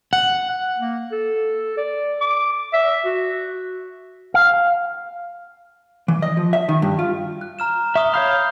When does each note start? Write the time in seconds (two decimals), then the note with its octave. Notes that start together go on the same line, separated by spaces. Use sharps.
0.13 F#5
0.78 A#3
1.12 A4
1.77 D5
2.21 D6
2.73 E5
3.05 F#4
4.34 F5
6.08 E3
6.22 D#5
6.37 F3
6.53 E5
6.69 D#3
6.82 G2
6.99 F4
7.41 F#6
7.59 A#5 F6 E7
7.96 E5 C#6 D#6 G7
8.14 C#5 F5 B5 F6 G6